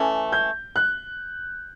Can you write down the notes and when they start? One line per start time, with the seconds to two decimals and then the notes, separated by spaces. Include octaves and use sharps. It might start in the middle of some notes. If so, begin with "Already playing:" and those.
Already playing: E3 A3 C#4
0.32 G6
0.76 F#6